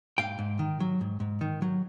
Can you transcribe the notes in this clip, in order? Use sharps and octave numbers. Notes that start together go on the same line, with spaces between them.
G#2 F5 G5
G#2
D#3
F#3
G#2
G#2
D#3
F#3